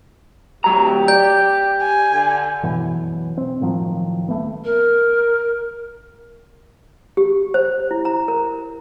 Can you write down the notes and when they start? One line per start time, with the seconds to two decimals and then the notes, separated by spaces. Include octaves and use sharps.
0.64 D2 F#3 G4 A#5
1.08 D5 G6
1.82 G#5
2.12 D3
2.63 F#2 B2 E3 F#3
3.37 C4
3.61 A2 D#3 F3 F#3
4.28 D1 A3 B3
4.64 A#4
7.17 G4
7.54 C5
7.91 E4
8.05 A#5
8.28 A#4